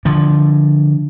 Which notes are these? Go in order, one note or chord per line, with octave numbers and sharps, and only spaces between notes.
D3 F3